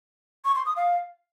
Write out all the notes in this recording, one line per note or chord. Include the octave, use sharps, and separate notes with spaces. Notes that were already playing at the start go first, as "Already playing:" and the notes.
C#6
C6
D#6
F5